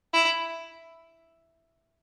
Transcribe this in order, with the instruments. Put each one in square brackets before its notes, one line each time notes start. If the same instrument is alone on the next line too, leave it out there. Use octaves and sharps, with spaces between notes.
[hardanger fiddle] E4